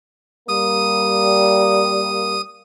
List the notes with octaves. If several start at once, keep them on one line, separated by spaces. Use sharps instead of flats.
G3 A#3 D#6